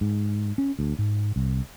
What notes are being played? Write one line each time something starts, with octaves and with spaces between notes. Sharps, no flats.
G#2
C#4
D2
G#2
C2